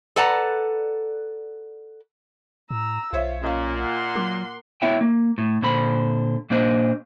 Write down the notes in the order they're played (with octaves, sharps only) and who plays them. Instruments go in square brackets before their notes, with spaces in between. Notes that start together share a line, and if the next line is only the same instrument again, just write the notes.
[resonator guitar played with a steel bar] A4 B4 D5 F#5 A5 A#5
[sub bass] A2 [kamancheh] A#5 E6
[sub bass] B1 [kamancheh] F4 [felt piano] C5 C#5 E5
[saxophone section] A#2 [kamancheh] C#4 [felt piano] D#5 F5
[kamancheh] F#5 C6
[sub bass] F#3 [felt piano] A#3 D6
[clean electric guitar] B3 E4 C#5 E5 G5
A#3
A2
A#2 D3 C5 B5
A#2 A#3 D4 C5 D#5